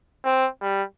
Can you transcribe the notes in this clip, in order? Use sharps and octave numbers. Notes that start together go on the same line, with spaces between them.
C4
G3